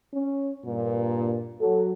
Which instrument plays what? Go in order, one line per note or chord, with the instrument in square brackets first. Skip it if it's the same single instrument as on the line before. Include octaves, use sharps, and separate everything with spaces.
[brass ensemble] C#4
G2 A#2
[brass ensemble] F#3 [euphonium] A4